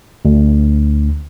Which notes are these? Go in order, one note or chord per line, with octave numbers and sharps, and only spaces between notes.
D2